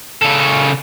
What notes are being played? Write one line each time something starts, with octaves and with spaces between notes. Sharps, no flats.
C#3 A4